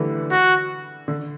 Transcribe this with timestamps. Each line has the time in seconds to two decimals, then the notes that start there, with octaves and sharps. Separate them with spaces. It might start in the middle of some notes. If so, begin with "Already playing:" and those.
Already playing: D3 E3 G3 A3
0.31 F#4
1.08 D3